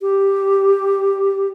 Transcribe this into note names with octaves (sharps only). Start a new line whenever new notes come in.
G4